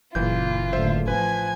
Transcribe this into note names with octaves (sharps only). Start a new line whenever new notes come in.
F#1 A#2 E3 F4 G6
A1 D3 C5 E5
F3 B4 G#5 G#6